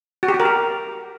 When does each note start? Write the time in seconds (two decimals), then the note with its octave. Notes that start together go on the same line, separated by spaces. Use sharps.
0.23 F#4
0.28 G4
0.34 F#4
0.40 A#4
0.45 G4